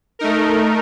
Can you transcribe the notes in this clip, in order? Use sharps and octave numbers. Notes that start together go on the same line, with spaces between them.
A3 D#4 A#4